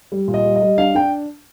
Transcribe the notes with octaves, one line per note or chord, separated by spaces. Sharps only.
G3
A#2
D#5
G3
D#5
G3
D4 F5
D4 G5